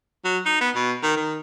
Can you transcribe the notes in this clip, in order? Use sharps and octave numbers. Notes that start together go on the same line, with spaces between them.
F#3
D#4
B3
B2
D#3
D#3